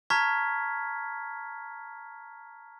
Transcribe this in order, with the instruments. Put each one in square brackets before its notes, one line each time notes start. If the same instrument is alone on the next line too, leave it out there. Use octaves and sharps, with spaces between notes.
[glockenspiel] A5 A#5 C#6 F6 G#6 B6